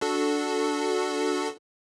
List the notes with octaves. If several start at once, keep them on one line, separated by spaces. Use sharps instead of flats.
D4 F#4 A4